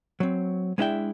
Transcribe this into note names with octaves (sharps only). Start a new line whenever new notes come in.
F#3 C4
G#3 B3 D4 E4 E5 G5